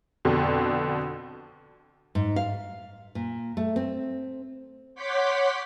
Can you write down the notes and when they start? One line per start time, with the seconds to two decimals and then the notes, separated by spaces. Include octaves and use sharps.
0.25 F2 B2 D3
2.15 G#2
2.36 F5
3.15 A#2
3.57 A3
3.76 C4
4.95 C#5 F#5 C6 D6 G6 B6